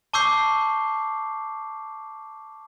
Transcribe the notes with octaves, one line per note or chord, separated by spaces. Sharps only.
A5 C#6 D6 E6 G6 C7